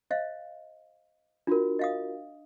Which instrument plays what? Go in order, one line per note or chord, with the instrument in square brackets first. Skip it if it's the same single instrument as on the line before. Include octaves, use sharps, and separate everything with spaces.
[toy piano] C5 D#5 F5
[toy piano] D4 [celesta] F4 F#4 A#4
[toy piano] D#5 F5 D#6